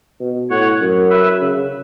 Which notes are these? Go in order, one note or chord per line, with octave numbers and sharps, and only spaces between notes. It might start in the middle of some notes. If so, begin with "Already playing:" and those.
B2
A2 C#5 F#5
F#2
B4 E5
C#3